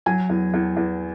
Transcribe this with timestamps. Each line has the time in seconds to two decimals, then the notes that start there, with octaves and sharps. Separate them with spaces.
0.06 F#3 G#5
0.29 E2
0.53 E2
0.76 E2